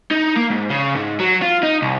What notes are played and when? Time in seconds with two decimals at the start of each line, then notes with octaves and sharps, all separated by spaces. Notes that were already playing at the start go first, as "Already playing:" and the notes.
0.11 D#4
0.37 A#3
0.51 G#2
0.70 C#3
0.95 G#2
1.20 F#3
1.42 F4
1.63 D#4
1.82 C2